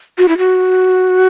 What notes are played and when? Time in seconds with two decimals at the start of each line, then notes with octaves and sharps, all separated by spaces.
0.18 F#4
0.28 E4
0.38 F#4